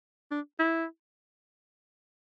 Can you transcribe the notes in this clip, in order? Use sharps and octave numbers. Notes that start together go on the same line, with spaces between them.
D4
E4